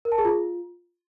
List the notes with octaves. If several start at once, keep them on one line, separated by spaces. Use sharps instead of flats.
A#4
A5
G#4
F4